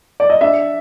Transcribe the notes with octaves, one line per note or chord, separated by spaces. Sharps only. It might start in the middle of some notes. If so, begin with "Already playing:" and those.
D5
D#5
D4 E5